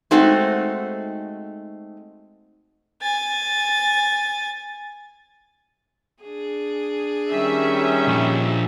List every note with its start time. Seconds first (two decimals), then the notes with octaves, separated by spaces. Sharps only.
0.11 G#3 A3 C4 D#4 F#4
3.02 G#5 A6
6.23 D4 G#4
7.31 D#3 G3 C#4 E5
8.08 A#2 F3